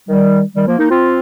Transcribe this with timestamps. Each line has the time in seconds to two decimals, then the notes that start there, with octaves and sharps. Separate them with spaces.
0.09 D#3 G3
0.56 D#3 G3
0.67 F3 A#3
0.79 A#3 D#4
0.90 C4 F4